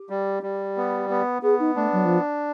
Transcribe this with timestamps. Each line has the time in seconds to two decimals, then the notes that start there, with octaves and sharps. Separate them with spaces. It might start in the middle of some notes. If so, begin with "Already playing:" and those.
Already playing: G4
0.10 G3
0.43 G3
0.77 B3
1.10 B3
1.42 B3 G#4
1.60 D#4
1.76 A3 D4
1.93 F#3
2.05 F3